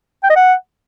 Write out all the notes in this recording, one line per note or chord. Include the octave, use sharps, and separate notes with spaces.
G5
D#5
F#5